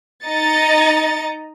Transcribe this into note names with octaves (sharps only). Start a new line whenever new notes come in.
D#4 D#5 A#5 A6 C#7